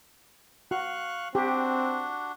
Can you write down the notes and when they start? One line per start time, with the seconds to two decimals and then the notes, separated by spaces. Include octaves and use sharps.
0.71 F#4 F5 C#6 F#6
1.35 C4 D4 F#4 G4